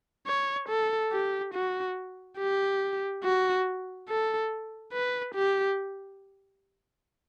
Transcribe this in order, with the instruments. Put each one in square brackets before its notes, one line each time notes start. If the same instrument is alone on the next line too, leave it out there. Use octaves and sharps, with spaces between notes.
[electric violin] C#5
A4
G4
F#4
G4
F#4
A4
B4
G4